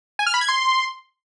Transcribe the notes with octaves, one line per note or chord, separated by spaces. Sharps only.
G#5
F6
B5
G#6
C6